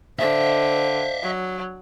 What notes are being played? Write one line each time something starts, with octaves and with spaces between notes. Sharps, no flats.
D3 C5 D#5 E5
F#3